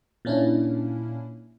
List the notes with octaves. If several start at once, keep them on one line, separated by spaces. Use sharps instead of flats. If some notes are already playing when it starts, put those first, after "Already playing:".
A#2 A#3 C#4 D4 E4